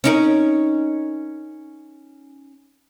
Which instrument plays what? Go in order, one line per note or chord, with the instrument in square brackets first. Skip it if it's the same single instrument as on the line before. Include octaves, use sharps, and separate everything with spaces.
[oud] C#4 D#4 A#4